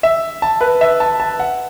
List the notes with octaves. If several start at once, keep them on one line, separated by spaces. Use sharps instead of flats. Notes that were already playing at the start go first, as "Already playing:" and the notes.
E5
A5
B4
E5
A5
A5
F#5